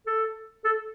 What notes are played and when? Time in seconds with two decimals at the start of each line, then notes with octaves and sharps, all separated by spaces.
0.07 A4
0.64 A4